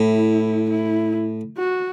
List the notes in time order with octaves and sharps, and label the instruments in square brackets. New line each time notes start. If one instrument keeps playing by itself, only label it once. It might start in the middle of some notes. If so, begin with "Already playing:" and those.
Already playing: [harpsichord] A2 [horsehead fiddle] E4
[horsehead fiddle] E4
F#4